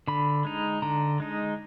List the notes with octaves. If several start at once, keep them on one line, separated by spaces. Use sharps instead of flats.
D3 B5
G#3 D#4
D3 A#5
G#3 D#4